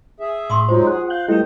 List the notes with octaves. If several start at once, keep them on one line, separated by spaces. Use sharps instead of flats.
G#4 E5
A2 C6 C#6 D#6
F#3 G#3 D#4 F4 C5
G#4 F#5
F5 F#6 G6
G3 A3 E4 G4 B4 D#5 G5